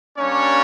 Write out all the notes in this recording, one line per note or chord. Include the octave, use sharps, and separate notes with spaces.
G3 A#3 C#4 D4 C#5